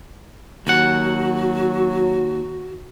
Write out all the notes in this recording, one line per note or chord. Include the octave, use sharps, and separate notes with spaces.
D#2 F#3 F#4 F#5